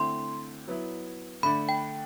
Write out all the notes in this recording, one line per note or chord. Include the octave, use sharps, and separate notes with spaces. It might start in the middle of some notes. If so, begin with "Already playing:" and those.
Already playing: D3 A3 C4 E4 C6
F#3 B3 E4
D3 A3 D4 B5
G5